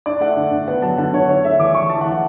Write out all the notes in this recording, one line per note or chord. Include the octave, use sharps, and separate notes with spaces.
D4 D5
A3 F#5
D3
D3
B3 F#5
F#3 A5
D3 F#5
D3 C#5
D4 C#5
A3 E5
E3 D6
E3 C#6
A3 A5
F#5
E3
F#5